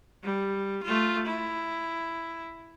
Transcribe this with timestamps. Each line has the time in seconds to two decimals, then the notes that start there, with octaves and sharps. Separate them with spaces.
0.23 G3
0.84 A3 F4
1.27 E4